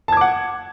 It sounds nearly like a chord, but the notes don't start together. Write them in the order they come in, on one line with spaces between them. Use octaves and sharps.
A5 G#6 D6 F#5